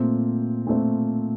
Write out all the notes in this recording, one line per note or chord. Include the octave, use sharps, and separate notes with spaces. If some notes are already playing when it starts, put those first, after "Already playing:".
Already playing: A#2 A3 C4
A#2 A3 C4